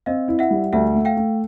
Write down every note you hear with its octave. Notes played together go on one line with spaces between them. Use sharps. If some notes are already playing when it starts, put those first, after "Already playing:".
C4 D#5 F5
E4
E5 F#5
G3
D2 E5 F#5
A3
F5 G5
A3